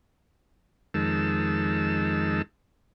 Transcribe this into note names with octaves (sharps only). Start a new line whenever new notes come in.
F2 D#3 G#3 A5 E6